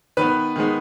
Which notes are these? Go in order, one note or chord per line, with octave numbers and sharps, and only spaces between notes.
D#3 B3 B4
D#3 G#3 B3